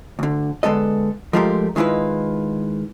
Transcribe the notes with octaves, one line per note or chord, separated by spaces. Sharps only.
D2 D3
D3 G#3 B3 A4 D#5
F3 G#3 A3 F4 G4 A#4
D#3 G#3 E4 F4 B4